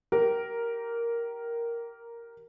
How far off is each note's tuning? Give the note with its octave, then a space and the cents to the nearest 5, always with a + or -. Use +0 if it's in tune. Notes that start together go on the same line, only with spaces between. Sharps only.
G4 -25 A#4 +0